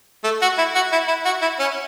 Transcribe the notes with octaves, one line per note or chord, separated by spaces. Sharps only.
A3
F#4
E4
F#4
E4
E4
F#4
E4
C#4